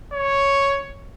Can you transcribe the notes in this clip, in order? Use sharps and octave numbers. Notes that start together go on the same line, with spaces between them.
C#5